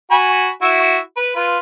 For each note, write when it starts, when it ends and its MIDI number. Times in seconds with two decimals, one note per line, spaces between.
0.11 0.49 66
0.11 0.49 80
0.11 0.49 83
0.62 0.98 64
0.62 0.98 66
0.62 0.98 76
1.17 1.33 71
1.36 1.58 65
1.36 1.58 71